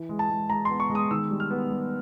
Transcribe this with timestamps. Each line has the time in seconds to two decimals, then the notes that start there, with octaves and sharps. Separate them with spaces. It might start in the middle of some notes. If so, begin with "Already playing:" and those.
Already playing: E3
0.09 G#3
0.19 A5
0.30 G#3
0.50 G#3 A#5
0.65 C6
0.69 B3
0.80 C#6
0.90 G#3
0.95 D#6
1.11 D#3 E6
1.31 G3
1.40 F6
1.51 B3
1.70 G3